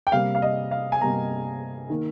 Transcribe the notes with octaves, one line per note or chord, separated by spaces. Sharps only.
G5
C3 G3 A#3 F5
F5
D#5
F5
G#5
C3 G3 A#3 A#5
D#3 A#3